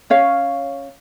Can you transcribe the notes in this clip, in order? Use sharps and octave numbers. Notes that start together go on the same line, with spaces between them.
C#4 C#5 F5